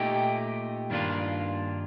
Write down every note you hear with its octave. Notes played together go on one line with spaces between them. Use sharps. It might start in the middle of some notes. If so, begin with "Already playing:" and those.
Already playing: A#2 A3 D#4 G4
G2 D#3 A#3 D4 F4